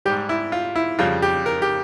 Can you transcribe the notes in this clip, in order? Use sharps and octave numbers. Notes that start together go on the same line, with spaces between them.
G#2 G3 G4
E4
F4
E4
F2 C#3 G3 F4
G4
A#4
G4